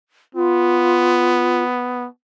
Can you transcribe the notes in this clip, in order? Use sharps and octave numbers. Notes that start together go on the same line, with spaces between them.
B3 F4